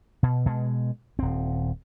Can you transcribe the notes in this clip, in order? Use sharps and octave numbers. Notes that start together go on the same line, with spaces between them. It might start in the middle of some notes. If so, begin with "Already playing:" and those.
B2
B2 G#3
D#1 C4